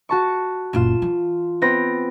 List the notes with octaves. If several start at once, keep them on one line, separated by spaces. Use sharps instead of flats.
F#4 A5 C#6
F#1 A#2 F4 E7
E3
B3 C4 A#6